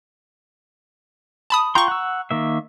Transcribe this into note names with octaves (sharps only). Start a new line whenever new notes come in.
A5 B5 D#6
F4 G5 A#5 C6 C#6
F#5 E6
D#3 A#3 E5